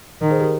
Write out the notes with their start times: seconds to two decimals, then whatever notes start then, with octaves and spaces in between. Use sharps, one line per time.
0.21 D#3
0.31 G#4 C5
0.41 G4 A#4